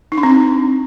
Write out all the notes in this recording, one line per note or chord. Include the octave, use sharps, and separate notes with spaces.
D#4
D4
C4